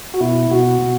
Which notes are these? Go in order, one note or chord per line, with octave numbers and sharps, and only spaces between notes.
F#4
B2 E4
B2 F#4
B2